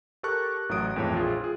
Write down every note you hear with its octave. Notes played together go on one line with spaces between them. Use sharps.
G4 A4 A#4 A5 C#6 F#6
A1 A2 F#3 D#6 D7
G#1 F2 A2 E3 G#3 C#5
A#1 F4 G#4
F4 G#4